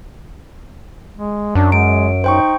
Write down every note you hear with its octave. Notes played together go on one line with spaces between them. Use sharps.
G#3
F#2 D4
G#3 D7
D#4 C5 G5 C#6